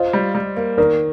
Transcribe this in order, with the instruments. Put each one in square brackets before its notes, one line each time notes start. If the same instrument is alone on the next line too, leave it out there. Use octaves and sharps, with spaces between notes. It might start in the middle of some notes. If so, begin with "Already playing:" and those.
Already playing: [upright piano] F4 [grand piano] C5 D#5
[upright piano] G3
G3
A#3
[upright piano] D#3 [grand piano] A#4 D5